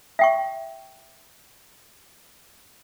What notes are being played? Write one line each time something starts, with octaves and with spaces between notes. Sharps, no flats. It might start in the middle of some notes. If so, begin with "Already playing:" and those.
E5 G5 C#6